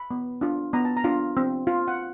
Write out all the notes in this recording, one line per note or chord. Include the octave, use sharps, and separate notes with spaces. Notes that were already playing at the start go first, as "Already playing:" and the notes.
Already playing: B5
B3
D4 F4
B3 A#5
A5
A#5
D4 F4
C4
F4
F#5